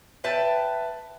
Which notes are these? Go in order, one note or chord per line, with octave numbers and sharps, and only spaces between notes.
B4 E5 G5 A5